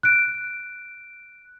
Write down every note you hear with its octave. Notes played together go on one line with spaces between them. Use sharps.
F#6 D7